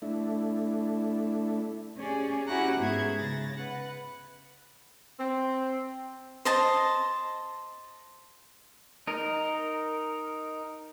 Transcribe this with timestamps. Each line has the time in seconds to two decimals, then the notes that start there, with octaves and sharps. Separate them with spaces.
0.02 A3 D4 E4
1.97 C#4 G4 G#4 D5
2.47 C#4 E4 F#4 G4 F#5 A#5
2.79 G#2 B3 C#4 G#4 E5 G#6
3.17 C#3 A6 A#6
3.56 B4 F#5
5.19 C4
6.45 C5 D#5 A5
9.07 D#4 A#4